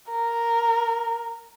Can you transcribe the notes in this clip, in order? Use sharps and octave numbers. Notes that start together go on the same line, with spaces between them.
A#4